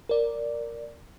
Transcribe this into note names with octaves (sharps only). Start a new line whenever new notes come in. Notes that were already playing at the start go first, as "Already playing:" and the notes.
A#4 D5